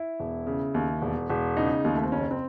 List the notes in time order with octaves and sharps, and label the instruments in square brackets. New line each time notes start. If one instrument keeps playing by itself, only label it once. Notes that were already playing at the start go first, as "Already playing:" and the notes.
Already playing: [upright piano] E4
E1
C#3
D#2
E1
E1
C#3 D#4
D#2 G#3
A3
C4
F#1 C#4
C4